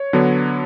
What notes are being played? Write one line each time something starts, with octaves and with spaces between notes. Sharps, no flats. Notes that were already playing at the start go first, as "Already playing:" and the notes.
Already playing: C#5
D3 F#3 B3 D4